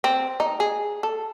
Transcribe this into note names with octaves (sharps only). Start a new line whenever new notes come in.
C4
D#4
G#4
A4